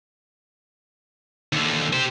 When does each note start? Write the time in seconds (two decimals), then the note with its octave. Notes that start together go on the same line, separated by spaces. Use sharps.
1.53 D#2 D3
1.93 G4 C5